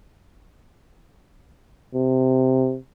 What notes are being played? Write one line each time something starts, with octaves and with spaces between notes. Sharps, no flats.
C3